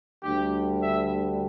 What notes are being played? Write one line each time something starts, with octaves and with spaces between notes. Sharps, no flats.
D2 D3 G3 G4
E5